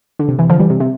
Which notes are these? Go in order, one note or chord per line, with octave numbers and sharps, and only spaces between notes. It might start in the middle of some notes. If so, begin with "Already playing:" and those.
D3
C3
C3 E3
D3 F3
E3 G3
C3
C3